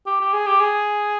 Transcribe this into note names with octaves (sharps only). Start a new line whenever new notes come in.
G4
G4
G#4
G4
G#4